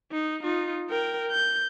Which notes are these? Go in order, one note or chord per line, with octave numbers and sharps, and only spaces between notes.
D#4
D#4 F4
A#4 G5
G6